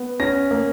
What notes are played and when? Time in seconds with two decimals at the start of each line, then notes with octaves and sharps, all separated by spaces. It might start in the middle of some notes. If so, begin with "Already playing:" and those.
Already playing: B3
0.20 C#4 A#6
0.51 A#3